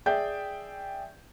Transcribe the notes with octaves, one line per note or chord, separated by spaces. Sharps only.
G#4 D5 E5 G5 G6